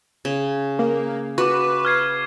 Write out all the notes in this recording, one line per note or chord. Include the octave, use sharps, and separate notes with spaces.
C#3
A#3
F#4 B4 C#6 D6
F6 G#6 C7